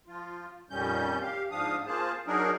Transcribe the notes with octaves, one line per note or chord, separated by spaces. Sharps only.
F3 F4
F2 A#2 D#3 G3 C#4 G6
G4 F5
G#2 F3 D4 F5 D#6
A#3 F4 G#4 C5 A5
F#3 D4 D#4 G#4 A#4